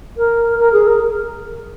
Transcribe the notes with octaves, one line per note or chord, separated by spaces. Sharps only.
A#4
A#4
G#4
A#4